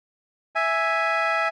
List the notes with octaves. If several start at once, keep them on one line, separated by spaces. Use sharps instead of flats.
E5 G#5